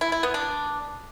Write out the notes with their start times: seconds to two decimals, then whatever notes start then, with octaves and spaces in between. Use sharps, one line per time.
0.01 E4
0.12 E4
0.23 B3
0.34 D4